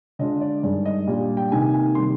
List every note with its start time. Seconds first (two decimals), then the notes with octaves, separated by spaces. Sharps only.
0.19 D3 G#3 D4 F4 D#5
0.41 D5
0.63 G2 D#3 G#3 D5
0.85 D#5
1.07 A#2 G3 D4 F4
1.37 G5
1.51 C3 D#3 A#3 D#4 G#5
1.74 G#5
1.95 C3 D#3 G3 C6